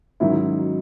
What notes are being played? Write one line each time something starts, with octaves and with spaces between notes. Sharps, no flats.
G#2 D#3 F#3 C#4 E4